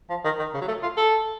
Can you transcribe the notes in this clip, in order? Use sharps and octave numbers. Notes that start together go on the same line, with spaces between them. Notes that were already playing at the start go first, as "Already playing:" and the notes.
F3
D#3
D#3
C#3
F#3
A3
F4
A4